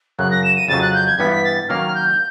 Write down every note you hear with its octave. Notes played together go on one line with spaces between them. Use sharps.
F#2 C#3 F#3 F#6
A#6
E7
D#7
F2 C#3 F#3 A6
F#6
G6
G#6
G2 E3 G3 B3 B6
B6
A6
D#3 F#3 A#3 C#4 F6
G6